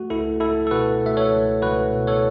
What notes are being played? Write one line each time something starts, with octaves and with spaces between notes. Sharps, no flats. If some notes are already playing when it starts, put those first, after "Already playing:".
Already playing: A3 F#4
C#2 E4 A4
C#2 E4 A4
A4
B2 F#4 B4
A3 E5
A4 C#5
C#2
C#2 F#4 B4
B2
A4 C#5